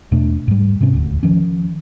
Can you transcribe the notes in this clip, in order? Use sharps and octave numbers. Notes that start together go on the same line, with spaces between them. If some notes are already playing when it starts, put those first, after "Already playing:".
E2 B2 A3 D4
G#2 G3
G#2 C3 C4 C#4
D#1 D2
D#3 F3 C#4